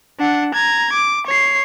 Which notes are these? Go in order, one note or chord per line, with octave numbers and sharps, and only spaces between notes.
D4 F#5
A#5 G#6
D6
C#5 C7